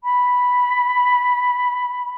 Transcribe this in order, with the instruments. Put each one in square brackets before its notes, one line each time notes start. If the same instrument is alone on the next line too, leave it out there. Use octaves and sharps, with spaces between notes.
[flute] B5